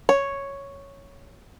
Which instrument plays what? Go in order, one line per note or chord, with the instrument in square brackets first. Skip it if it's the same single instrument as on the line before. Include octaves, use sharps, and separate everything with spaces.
[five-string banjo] C#5